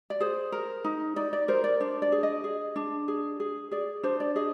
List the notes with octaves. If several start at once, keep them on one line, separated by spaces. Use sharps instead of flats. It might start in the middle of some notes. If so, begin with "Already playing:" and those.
D5
G#4 C5
A#4
D#4
D#4 D5
D5
A#4 C5
D5
D4 C5
D5
G#4
D#5
G#4
D4
G#4
G#4
G#4 D5
D4 C5
D5
G#4 D#5